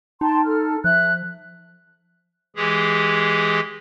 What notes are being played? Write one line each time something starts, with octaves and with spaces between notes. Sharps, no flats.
D#4 G5 A5 C6
A4 F6
F3 E5 F#6
E3 G#3 G4 G#4